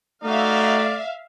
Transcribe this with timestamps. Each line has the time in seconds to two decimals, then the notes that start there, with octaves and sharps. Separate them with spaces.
0.24 A3 D#4 F#4 D5 E5 F5